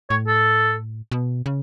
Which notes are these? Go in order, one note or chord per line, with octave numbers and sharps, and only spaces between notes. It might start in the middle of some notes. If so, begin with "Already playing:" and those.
A2 C#5
A4
B2
C#3